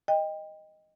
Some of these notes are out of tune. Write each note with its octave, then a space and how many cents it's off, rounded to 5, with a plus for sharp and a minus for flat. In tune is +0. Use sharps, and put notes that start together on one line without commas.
D#5 +0 G5 +20